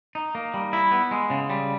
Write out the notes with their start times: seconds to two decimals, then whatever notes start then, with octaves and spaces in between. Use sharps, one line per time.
0.15 D#4
0.35 A#3
0.54 G3
0.73 E4
0.91 B3
1.11 G#3
1.30 C#3
1.50 G3